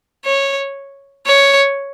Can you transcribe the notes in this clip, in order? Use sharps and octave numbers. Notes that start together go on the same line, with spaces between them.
C#5
C#5